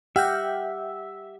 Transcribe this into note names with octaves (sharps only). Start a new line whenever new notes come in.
G4 E5 F#5 G5 F6 G6 A#6